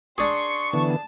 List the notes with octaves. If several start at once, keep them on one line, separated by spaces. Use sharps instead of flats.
D4 G#4 C6 C#6
D3 E3 B3 A5